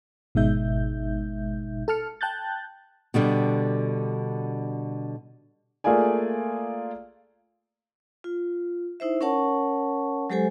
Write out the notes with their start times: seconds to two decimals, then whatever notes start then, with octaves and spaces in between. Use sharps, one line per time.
0.35 G#1 B2 G#3 D#4 E5 G6
1.88 A4 A5 F6 C#7
2.21 G5 A5 F#6 G6 A6
3.14 B2 D3 G3 D4
5.84 A3 A#3 F4 G#4 D5 G#5
8.24 F4
9.00 D#4 E4 C5 E5
9.21 C#4 A#4 C#5 F#5 A5 C#6
10.30 F#3 G#3 G4 A4 C5 G#5